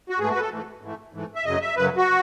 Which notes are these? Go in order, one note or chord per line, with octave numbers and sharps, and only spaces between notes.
F#4
G#2 E3 A3 G#4
F#4
B4
A4
G#2 E3 A3
G#2 E3 A3
G#2 E3 A3
E5
F#2 C#3 F#3 D#5
E5
F#2 C#3 F#3 B4
F#4